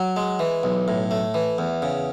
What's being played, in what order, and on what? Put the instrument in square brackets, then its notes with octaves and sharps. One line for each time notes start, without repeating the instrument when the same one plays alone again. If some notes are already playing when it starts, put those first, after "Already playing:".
Already playing: [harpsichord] F#3
G#3
E3
B1
A2
A3
E3
E2
C#3